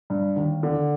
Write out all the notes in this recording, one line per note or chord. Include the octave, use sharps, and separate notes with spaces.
G2
D#2
D3